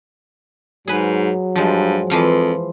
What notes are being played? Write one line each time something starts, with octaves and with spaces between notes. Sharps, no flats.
G#2 F#3 G#4 B4
G2 F3 G#3
F2 E3 F3 F5